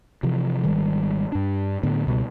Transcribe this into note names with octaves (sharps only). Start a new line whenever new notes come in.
C3 E3 F3
G#1 D#3 G3 G#3
G2 D4
A2 D3 B3
C#2 B2 G3